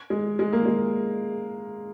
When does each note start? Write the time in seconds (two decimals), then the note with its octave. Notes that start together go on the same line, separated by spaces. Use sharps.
0.10 G#3
0.39 G#3
0.53 A#3
0.66 G#3